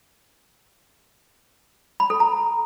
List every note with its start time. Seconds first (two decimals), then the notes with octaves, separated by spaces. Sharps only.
2.00 B5
2.10 A4
2.20 A#5